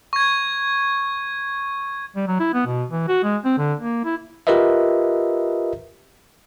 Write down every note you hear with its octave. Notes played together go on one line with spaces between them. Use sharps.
C#6 G#6
G3
F#3
E4
B3
B2
E3
F#4
G#3
C4
D3
A#3
E4
F4 G4 A#4 B4 D#5 E5